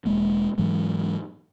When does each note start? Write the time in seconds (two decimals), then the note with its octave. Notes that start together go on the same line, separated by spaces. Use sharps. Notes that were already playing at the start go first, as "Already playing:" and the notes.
0.05 E1 G#3 A#3
0.58 G#2 E3 F#3 G#3